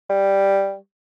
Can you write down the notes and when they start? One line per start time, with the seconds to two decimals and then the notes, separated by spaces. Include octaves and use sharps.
0.09 G3